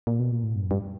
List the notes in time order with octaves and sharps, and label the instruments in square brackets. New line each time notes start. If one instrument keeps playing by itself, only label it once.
[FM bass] A#2
B2
A#2
A2
G2
F#2
G2